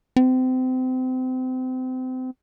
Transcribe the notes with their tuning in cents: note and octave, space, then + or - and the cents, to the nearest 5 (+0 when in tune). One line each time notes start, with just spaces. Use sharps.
C4 -30